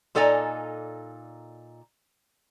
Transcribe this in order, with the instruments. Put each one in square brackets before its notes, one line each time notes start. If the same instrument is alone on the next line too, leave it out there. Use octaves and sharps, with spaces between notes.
[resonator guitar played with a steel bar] A#2 D#4 A4 D5 G#5 A#5